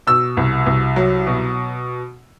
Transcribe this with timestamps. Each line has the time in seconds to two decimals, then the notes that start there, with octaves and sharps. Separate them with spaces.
0.07 B2 E6
0.37 C2
0.66 C2
0.96 F#3
1.27 B2